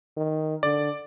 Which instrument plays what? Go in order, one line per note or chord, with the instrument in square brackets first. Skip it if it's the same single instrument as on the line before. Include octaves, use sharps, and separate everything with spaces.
[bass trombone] D#3
[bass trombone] D3 [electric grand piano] D5